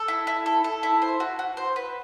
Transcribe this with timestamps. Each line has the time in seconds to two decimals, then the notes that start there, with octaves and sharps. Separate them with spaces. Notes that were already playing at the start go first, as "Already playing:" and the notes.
Already playing: A4
0.08 E4
0.27 E4
0.46 A4
0.64 A4
0.83 E4
1.02 C5
1.20 F#4
1.39 F#4
1.57 C5
1.76 B4